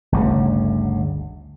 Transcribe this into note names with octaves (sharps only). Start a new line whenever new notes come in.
G1 D2 C#3